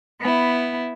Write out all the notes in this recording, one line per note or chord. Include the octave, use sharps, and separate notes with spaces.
B3 E4